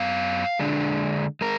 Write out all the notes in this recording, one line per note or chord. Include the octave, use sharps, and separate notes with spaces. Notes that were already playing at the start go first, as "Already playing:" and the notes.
Already playing: F#2 B3 F5
D3 G#3 D4
G#3 A#4